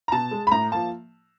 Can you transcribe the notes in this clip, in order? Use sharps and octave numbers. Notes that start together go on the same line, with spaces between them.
A#5
B2 A5
G#3
B5
A2 A#5
F3 A#3 A5